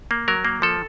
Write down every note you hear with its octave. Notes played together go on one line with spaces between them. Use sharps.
A#3
F#3 A#4
A#3
F3 A4